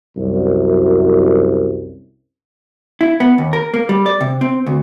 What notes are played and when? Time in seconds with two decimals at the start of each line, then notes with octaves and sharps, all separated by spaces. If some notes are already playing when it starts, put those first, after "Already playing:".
0.17 C2 F#2
3.01 E4
3.20 B3
3.38 D#2
3.53 A#4
3.74 A#3
3.89 G3
4.06 D5
4.21 C3
4.41 C4
4.66 D2